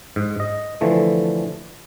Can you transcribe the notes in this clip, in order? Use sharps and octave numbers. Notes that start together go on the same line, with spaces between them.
G#2
D#5
D3 E3 F3 A3